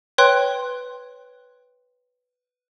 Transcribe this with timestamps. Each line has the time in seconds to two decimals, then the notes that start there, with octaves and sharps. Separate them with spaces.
0.18 B4 C#5 G5 C6 F#6